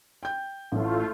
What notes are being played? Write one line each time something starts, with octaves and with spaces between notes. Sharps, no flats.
G5 G6
A1 A2 A3 F4